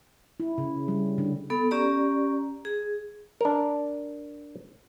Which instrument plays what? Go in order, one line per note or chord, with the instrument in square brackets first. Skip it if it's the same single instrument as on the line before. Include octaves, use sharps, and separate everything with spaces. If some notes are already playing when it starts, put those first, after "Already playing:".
[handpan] E4
C#3
G3
D3
[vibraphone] B3 A4
C#4 G4 D5 A#5
G#4
[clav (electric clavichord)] D4 A#4